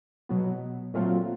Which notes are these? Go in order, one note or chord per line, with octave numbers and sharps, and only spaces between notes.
B2 F#3 B3
A#2 F#3 A3 C4 F4